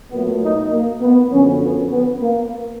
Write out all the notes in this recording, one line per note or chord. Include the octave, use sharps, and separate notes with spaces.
A#2 F#3 A3 B3
D#4
A#3
B3
F#2 D3 F3 C#4
B3
B3
A#3